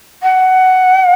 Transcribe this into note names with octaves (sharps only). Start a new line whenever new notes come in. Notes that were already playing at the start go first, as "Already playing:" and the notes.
F#5